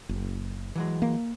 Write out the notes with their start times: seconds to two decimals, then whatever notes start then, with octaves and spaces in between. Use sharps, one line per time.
0.09 F#1
0.76 E3 F#3 G#3
1.02 A#3